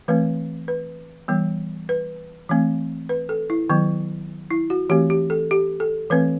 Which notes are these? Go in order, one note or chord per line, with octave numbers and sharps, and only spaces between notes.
E3 A3 C4 B4
B4
E3 G3 B3
B4
E3 A3 C4
B4
A4
E4
D#3 F#3 B3
E4
F#4
E3 A3 C4 G4
G4
A4
G4
A4
E3 A3 C4 B4